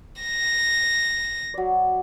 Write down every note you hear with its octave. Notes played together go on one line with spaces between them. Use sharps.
A#6
F#3 D5